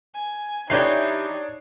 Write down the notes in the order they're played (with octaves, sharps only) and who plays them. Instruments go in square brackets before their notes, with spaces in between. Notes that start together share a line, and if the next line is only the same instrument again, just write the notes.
[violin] G#5
[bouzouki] E3 G4 G5 [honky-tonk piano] D4 C#5 C7 [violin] D#4